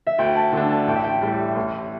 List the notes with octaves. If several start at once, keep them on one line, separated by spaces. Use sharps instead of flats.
E5
D2 G5
A5
D3 A3 D4
A5
A1 G5
E5
G5
A2 G3
A1